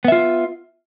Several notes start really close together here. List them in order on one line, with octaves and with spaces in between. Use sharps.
B3 E5 F4